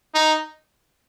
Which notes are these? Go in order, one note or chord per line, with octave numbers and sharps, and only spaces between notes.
D#4